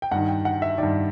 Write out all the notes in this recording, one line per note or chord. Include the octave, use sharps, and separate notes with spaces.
G5
G2 D#3 F#5
G5
F#5
E5
G2 D#3 D5